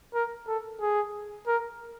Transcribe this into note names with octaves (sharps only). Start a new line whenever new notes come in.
A#4
A4
G#4
A#4